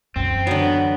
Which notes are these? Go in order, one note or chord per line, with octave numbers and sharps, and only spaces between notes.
F#2 E3 C4
D3 F#3 B3